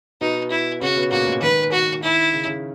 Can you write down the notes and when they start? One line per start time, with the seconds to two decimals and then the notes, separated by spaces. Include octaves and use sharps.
0.21 B2 B3 D#4
0.51 E4
0.81 C#3 C#4 F#4
0.96 B2 B3
1.11 A#2 A#3 F#4
1.27 G#2 G#3
1.42 D#3 B4
1.72 F#4
2.03 E4
2.33 C#3
2.47 C#3